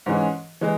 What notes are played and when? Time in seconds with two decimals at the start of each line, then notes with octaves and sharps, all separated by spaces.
0.06 G#2 E3 G#3 C#4
0.61 E3 G#3